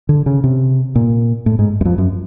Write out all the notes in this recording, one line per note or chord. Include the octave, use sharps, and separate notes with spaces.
D3
C#3
C3
A#2
A2
G#2
F#2
F2
F#2